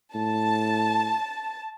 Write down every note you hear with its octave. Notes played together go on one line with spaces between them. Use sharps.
A2 A5